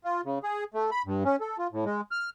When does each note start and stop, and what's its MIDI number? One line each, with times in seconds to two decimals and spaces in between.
0.04 0.21 65
0.25 0.39 49
0.43 0.64 68
0.74 0.90 57
0.91 1.02 83
1.06 1.24 43
1.25 1.36 61
1.41 1.57 69
1.58 1.67 65
1.72 1.85 45
1.86 2.01 56
2.11 2.30 89